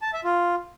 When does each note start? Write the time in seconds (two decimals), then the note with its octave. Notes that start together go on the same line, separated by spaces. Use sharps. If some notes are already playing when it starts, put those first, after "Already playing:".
0.02 A5
0.13 E5
0.24 F4